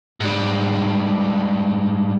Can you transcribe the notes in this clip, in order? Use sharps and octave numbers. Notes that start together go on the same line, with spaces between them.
G#2 G3